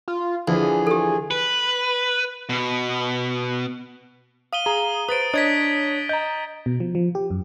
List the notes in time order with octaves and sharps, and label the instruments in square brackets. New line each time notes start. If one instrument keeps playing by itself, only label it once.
[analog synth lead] F4
[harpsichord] E2 [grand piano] D3 E3 F3 [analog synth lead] G#4
[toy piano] G4 A4
[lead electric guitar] B4
B2
[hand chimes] F5 [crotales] D#6 D#7 G7
[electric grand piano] G#4 [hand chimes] A#5
[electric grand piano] B4 C5 [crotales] D#6 A6 D7
[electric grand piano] D4 C#5 D#5 [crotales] D#6 G#6 B6
[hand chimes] D#5 A#5 [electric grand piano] G6
[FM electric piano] B2
F3
F3
G4
F#2